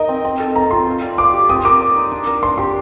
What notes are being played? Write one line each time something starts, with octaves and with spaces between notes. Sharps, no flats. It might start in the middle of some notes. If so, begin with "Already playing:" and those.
Already playing: D#4 A#4 D#5
C4
C4
A4
C4 A#5
F4 C6
C4
D5
F5 D6
G4
C4 D#6
C6
A#4 D6
D5
D#4
D4
A#4
D4 C6
G4 C6